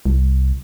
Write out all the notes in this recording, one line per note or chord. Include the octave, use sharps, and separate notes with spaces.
C2